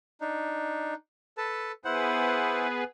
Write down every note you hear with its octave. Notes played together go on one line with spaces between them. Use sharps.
D4 D#4
A4 B4 A5
B3 E4 G#4 B4 C5 F#5